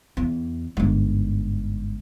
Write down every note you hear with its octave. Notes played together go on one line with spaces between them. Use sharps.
E2
G1 G#2